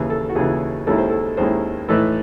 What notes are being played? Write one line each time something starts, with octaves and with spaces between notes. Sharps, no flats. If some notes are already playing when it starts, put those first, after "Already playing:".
Already playing: D#2 C#3 E3 G#4
A4
F#4
D#2 C#3 E3 G#4
D#2 D#3 G#3 C#4 E4 A4
C5
A4
D#2 D#3 G#3 C#4 E4 C5
A2 E3 A3 D#4 A4